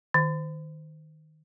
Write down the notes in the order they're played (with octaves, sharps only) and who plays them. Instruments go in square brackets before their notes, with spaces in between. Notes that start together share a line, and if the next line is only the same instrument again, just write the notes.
[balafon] D#3